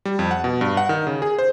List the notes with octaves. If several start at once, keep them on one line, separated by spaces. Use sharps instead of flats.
G3
F2
F#5
B2
G2
F#5
D#3
C#3
G#4
C5